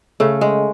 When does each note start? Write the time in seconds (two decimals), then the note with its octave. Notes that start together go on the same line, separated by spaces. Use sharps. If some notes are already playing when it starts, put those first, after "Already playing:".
0.20 C#3 A3
0.41 G#3